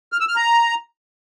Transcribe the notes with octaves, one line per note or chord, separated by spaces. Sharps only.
F6
E6
F6
A#5